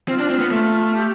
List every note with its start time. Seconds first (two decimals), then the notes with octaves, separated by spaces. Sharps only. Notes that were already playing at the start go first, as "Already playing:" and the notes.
0.08 C4 F4
0.19 D4
0.30 C4
0.40 B3
0.51 A3
0.94 G4